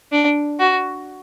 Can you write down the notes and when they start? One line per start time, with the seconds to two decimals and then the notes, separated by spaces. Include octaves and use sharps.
0.12 D4
0.59 F#4